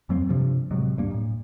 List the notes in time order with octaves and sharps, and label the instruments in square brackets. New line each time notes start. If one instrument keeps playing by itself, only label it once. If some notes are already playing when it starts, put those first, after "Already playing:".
[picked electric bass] F2 F#3 A#3 C4
G2 C3 F3
A2 C3 F#3 G#3
D1 G2 A#3
A2